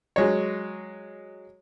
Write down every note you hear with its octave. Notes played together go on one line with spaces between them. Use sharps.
F#3 G#3 C#5